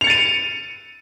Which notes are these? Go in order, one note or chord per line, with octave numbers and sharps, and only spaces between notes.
A6 C#7 D#7 F7